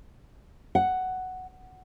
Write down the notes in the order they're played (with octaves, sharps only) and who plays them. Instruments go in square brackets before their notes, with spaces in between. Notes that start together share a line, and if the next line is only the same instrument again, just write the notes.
[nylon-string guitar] F#5